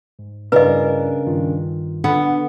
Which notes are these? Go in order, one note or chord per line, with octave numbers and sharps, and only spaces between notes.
G#2
G2 C#3 D4 E4 A#4 B4 D5 D#5
G2 D#3 F4
D3 B3 D4